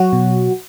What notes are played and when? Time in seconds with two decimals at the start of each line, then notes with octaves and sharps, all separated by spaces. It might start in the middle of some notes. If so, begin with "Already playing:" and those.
Already playing: F#3 F#4
0.13 B2